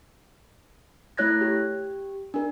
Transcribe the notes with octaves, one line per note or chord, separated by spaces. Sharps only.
A3 E4 C#5 F#6 G#6 A#6
G4
D4 A#4